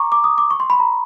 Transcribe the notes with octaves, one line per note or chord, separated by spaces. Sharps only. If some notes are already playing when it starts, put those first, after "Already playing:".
Already playing: A#5 C#6 D6
D6
D#6
D6
C#6
C6
B5
A#5